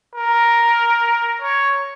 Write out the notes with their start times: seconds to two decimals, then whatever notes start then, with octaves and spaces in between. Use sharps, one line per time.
0.15 A#4
1.42 C#5